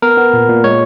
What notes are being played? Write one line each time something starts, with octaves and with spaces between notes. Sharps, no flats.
B3 A#4
B3
A#2
A#2
G#3 C#5